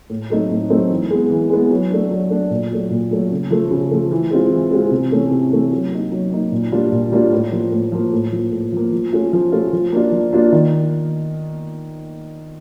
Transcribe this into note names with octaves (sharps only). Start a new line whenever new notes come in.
A2
F#3 A3 C4 D#4
A2
F#3 A3 C4 D#4
E3
G#3 B3
E3
G#3 B3
F#3
A3 D4
F#3
A3 D4
A#2
F#3 A3
A#2
F#3 A3
C#3
F3 A3
C#3
F3 A3
E3
G#3 C4 F4
E3
G#3 C4 F4
C3
E3 A3 C#4
C3
E3 A3 C#4
F#3
A#3 D#4
F#3
A#3 D#4
A#2
G3 A#3 D4 F4
A#2
G3 A#3 D4 F4
A2
F3 A#3
A2
F3 A#3
A2
F3 A#3
A2
F3 A#3
F3
A3 C#4 F4
F3
A3 C#4 F4
F3
A#3 D4 F4
F3
A#3 D4 F4
D#3